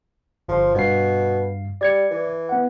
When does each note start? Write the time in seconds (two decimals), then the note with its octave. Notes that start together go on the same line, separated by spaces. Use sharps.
0.48 G1 F3 C6
0.75 G2 B2 F5 C7
1.81 G3 D5 G#6 C#7
2.11 E3
2.49 B3 F#5